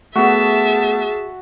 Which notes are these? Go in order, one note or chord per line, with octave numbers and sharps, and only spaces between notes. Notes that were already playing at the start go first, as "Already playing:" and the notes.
A3 B3 F#4 G#4 E5 A5